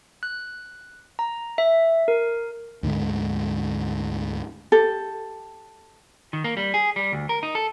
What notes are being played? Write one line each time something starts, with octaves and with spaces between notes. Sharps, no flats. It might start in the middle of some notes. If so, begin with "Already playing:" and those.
F#6
A#5
E5
A#4
D2 G#2 D3 G#3
G4 A4
D#3
A#3
G3
G#4
G3
D2
A#4
D#4
A4